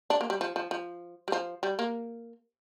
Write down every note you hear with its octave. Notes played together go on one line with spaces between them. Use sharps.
D4
A#3
G3
F3
F3
F3
G3
F3
G3
A#3